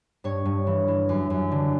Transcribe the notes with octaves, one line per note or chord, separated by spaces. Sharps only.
G2 C#5
G2
E3
E3
F#2
F#2
D3